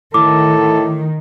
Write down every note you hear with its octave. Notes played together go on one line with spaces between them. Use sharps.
A2 D#3 A4 D6